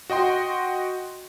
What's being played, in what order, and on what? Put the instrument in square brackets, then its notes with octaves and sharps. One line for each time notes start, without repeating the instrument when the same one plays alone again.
[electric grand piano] F#4 D#5 G5 C6